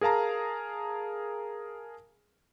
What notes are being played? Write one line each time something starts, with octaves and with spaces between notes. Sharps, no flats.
G#4 A#4 F5 A5 A#5